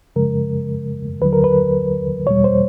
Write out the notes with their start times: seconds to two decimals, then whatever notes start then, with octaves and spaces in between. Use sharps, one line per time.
0.16 F#2 C#3 F3 G#3 A#4
1.21 D#2 D3 F#3 B4
1.33 A#4
1.44 B4
2.27 E2 B2 G3 C#5
2.44 C5